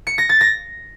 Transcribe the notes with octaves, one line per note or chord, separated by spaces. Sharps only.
C#7
A#6
A6
A#6